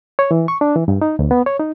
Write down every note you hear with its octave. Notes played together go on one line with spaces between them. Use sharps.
C#5
E3
C#6
D4
E3
G2
D#4
D2
B3
C#5
D#4